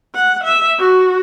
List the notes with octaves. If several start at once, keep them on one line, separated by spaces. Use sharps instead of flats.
F#5
E5
F#4